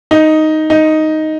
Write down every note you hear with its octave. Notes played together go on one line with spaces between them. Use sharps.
D#4
D#4